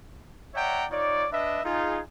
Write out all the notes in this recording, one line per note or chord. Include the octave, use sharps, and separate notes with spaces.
C#5 D5 E5 F#5 G5 A#5
D#4 F4 C#5 D5
D4 B4 D#5 E5
D#4 F4 G#4